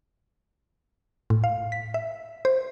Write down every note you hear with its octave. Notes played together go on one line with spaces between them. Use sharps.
A2
F5
B6
E5
C5